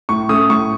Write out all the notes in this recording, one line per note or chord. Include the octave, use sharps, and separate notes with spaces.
A2 C#6
A3 C#4 D#6
A2 C#6